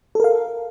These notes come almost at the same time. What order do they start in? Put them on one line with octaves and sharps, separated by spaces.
A4 A#4 F5